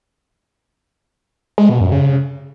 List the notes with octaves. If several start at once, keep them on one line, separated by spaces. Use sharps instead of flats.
G#3
B2
F#2
C#3